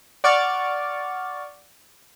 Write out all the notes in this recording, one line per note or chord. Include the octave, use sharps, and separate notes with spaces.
D5 F#5 C#6 D6 F6 A6